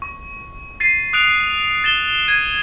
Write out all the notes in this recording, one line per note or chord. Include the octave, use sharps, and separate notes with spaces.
C#6
A6 C7 D#7
D#6 F#6 D7 F7
A6 E7 G7
G#6 D#7